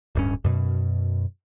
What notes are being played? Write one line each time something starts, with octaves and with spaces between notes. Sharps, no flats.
D1 G2 C#4
F#2 B2